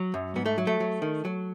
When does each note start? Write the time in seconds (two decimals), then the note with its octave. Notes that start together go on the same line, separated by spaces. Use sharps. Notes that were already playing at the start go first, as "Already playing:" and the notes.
Already playing: F#3
0.14 F#2
0.36 G#2 B3
0.46 A3
0.58 F#3
0.67 A3
0.80 F#3
1.02 D#3
1.25 F#3